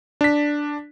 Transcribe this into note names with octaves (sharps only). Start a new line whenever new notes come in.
D4 B6